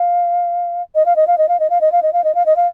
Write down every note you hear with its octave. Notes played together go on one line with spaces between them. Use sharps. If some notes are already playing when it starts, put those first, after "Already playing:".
Already playing: F5
D#5
F5
D#5
F5
D#5
F5
D#5
F5
D#5
F5
D#5
F5
D#5
F5
D#5
F5